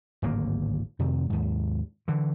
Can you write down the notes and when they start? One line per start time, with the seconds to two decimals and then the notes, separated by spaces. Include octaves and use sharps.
0.22 D1 G#1 A#3
0.99 F2 C3 D#3
1.30 D#2 G#2
2.08 D3 E3